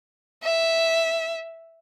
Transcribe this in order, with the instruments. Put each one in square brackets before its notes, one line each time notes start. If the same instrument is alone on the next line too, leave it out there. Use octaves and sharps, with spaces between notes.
[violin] E5